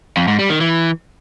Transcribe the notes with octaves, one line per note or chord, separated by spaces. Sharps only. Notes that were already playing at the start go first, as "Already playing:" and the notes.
F2
G#2
G3
D#3
E3